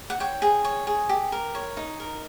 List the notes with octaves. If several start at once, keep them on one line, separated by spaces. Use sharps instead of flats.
F#5
C#5 G5
G#4
C#5
G#4
G4
A#4
C#5
D#4
A#4